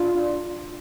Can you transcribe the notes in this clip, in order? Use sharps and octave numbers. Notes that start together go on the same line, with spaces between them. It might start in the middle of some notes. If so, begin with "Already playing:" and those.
Already playing: D4 F4